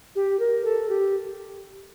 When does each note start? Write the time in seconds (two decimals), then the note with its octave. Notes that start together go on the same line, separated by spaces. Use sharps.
0.16 G4
0.40 A#4
0.65 A4
0.89 G4